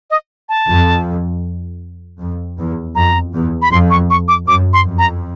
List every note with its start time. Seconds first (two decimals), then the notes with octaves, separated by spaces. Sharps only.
0.10 D#5
0.49 A5
0.68 F2
2.20 F2
2.58 E2
2.95 F2 A#5
3.34 E2
3.62 B5
3.72 F2 C6
3.90 C#6
4.10 C#6
4.28 D6
4.48 F#2 D6
4.73 C6
4.86 F2
4.98 A#5